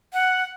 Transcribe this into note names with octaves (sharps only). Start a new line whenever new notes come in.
F#5